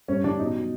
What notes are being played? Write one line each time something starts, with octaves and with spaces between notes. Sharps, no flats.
G2 C#4
D#3 G3 D4
B2 D#4
F#3